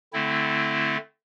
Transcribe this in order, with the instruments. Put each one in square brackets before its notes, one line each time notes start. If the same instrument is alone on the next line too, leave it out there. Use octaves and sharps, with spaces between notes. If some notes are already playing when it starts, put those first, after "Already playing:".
[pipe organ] D3 A3 C4 E4